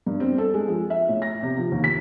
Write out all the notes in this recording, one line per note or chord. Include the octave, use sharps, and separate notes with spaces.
G2
C4
A4
G#3
F3
E5
A2
A#6
C3
F3
D#2
B6